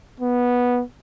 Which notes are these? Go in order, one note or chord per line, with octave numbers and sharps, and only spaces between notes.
B3